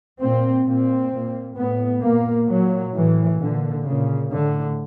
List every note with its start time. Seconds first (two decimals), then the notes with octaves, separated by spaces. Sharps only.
0.20 A#2 C4
0.65 A#2 C4
1.12 A#2
1.57 A2 B3
2.02 A#2 A#3
2.49 A#2 F#3
2.94 A2 E3
3.40 A#2 D3
3.85 A#2 C#3
4.31 A2 D3